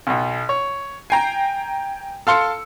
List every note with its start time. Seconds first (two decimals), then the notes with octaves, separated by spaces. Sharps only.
0.07 B1 B2
0.49 C#5
1.10 G5 G#5 A#5 C7
2.27 A4 F5 C6 E6 C#7